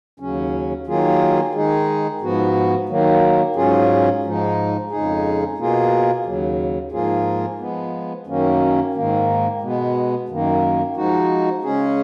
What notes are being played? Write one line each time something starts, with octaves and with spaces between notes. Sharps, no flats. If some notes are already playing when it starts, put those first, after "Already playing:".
D#2 C#3 F#3 C#4
D#3 F#3 A#3 F4 G#4
D#3 G#3 D#4 G#4
G#2 F3 B3 F#4
D#3 F#3 A#3
G#2 F#3 C#4 F4 G#4
G#2 F3 G#3 D#4
F2 C#3 G#3 D#4 G#4
B2 A#3 F4 G#4
D#2 C#3 F#3
G#2 F3 A#3 F4 G#4
F3 G#3 B3
F#2 D#3 F#3 A#3 C#4
G#2 D#3 A#3
B2 G#3 B3
F#2 D#3 A#3
F3 G#3 D#4 F#4
C#3 G#3 C#4 G#4